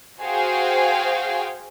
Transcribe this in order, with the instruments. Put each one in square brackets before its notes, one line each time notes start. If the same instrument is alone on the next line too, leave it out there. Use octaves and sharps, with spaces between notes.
[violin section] F#4 G#4 C5 F5 G5